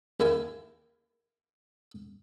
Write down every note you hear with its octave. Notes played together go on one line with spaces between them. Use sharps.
D#2 A#3 E4 G#5